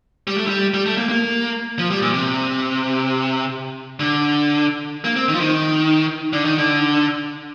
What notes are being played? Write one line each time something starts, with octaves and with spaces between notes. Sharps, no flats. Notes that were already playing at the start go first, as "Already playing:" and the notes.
G3
A3
G3
G3
A3
A#3
A#3
F3
G3
A#2
C3
D3
A#3
C4
D#3
F3
D#3
D3
D#3
D3